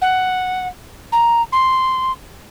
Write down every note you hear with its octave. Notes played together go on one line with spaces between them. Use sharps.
F#5
A#5
C6